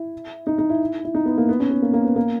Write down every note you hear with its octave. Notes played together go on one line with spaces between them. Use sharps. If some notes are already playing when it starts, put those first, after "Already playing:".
Already playing: E4
D#4
D#4
E4
E4
D#4
B3
A#3
B3
C#4
B3
A#3
A#3
B3
A#3